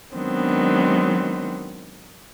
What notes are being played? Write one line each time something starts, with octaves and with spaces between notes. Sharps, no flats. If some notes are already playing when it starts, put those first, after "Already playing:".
D#3 F#3 G#3 B3 C4 D4